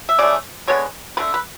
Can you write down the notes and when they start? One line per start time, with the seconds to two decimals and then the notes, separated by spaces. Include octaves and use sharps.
0.09 E5
0.18 C#3 E3 A3 D5
0.68 D3 G#3 B3 C#5
1.17 D3 A3 B4
1.34 B4